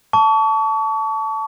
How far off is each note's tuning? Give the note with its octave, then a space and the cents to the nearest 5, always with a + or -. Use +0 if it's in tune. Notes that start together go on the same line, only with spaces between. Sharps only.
A5 +0 C#6 +40